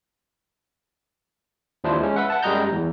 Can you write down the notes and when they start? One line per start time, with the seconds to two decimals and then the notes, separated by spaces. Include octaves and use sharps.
1.84 D#2 F3 D4 E4 C5
2.01 G#3 C#4
2.16 B4 E5 F#5
2.30 F#5 A5
2.43 F#2 G3 G#3 D#5 A#5 G6
2.72 E2